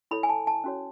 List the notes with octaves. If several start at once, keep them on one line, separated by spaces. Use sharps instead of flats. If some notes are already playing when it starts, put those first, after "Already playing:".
E4 A4 C#5 B5
G#5
A5
A5
C#4 F#4 C#5